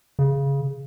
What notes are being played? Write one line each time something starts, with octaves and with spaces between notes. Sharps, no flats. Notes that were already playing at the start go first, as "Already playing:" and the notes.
C#3